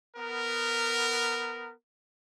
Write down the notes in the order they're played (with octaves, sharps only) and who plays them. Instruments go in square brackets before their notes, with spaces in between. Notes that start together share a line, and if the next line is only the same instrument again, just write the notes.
[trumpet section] B3 A#4